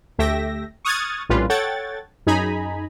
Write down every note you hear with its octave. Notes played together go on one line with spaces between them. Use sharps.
D2 A3 G4 E5 G5 A#6
C#6 D#6 F6 F#6 G#6 A6
A#1 A2 G3 C#4 F4 B4
A4 C#5 F#5 G5 G#6 A6
F#2 D#4 G#4 G#5 A#5 B5